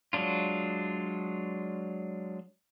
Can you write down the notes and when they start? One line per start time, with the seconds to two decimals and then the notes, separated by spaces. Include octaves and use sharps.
0.13 F#3 G#3 D4 F4